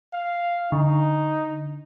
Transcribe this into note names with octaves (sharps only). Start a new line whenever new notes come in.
F5
D3 D#4